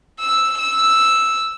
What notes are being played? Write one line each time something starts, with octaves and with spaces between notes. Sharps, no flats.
E6
E6